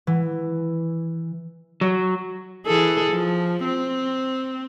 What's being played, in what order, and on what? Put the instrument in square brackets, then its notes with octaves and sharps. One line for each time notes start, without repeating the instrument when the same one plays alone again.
[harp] E3
[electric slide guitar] F#3
[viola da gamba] E3 G#4 A4
F3
C4